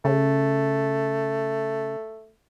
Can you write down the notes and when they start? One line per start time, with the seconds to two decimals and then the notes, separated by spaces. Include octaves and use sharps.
0.05 C#3 A3